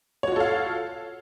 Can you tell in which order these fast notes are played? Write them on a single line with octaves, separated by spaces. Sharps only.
C#5 F#4 F4 A4 F5